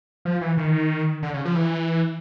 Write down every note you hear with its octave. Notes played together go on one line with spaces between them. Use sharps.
F3
E3
D#3
D3
C#3
F3
E3